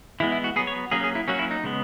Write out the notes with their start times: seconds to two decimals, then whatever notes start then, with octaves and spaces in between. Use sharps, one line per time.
0.20 E3 G#3 B3 E4
0.32 E4
0.44 F#4
0.56 F#3 B3 G#4
0.67 C#5
0.91 F#3 A#3 C#4 G#4
1.04 G#4
1.15 E4
1.28 F#3 A#3 C#4 F#4
1.39 E4
1.51 D#4
1.64 C#3 G#3 B3